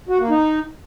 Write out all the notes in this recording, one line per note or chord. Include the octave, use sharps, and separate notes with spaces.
F#4
A#3
D#4